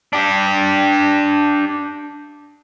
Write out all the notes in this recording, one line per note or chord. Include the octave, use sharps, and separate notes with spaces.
D4 G4